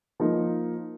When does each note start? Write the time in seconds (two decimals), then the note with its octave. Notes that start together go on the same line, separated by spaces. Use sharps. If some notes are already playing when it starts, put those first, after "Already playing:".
0.20 F3 A#3 D#4